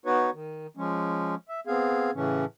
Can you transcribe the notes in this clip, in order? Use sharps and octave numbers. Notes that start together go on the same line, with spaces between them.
B3 D#4 F#4 B4 C#5
D#3
F3 G#3 C#4
E5
B3 C4 G#4 F5
A2 C#3 E3 C#4